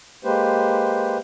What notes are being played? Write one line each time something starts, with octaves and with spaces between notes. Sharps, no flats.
G#3 A#3 G4 B4 C5